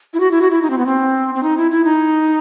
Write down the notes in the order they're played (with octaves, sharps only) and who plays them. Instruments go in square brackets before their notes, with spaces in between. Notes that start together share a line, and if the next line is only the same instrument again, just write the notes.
[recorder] E4
F#4
E4
F#4
E4
D#4
C4
B3
C4
C4
D#4
E4
E4
D#4